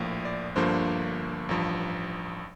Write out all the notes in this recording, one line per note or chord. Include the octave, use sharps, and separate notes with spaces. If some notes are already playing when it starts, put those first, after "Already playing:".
Already playing: A#1 A2 F3 A#3
D5
G1 G2 D3 F3 A#3 C5
A1 G2 F3